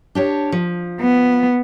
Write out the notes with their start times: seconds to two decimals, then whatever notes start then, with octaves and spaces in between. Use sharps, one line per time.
0.15 D4 G4 C#5
0.52 F3
1.00 B3